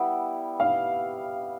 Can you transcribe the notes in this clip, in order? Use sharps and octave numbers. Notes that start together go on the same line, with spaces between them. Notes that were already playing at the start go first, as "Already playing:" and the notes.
Already playing: G3 B3 E4
F5